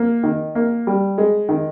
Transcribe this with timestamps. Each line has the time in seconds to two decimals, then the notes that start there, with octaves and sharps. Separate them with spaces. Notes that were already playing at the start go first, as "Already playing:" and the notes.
Already playing: A#3
0.24 D#3
0.55 A#3
0.87 G3
1.18 G#3
1.49 D#3